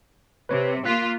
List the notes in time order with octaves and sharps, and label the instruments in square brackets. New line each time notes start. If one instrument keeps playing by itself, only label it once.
[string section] C3 [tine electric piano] B4 C#5
[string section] A#3 F4 [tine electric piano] F#6 B6